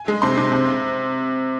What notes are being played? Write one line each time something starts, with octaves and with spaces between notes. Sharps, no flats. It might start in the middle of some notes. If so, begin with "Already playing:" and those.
Already playing: G#5
G#3
C3 C6
C3
C3